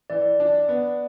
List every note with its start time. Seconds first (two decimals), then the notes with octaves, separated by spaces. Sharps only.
0.10 E3 D5
0.40 D4
0.69 B3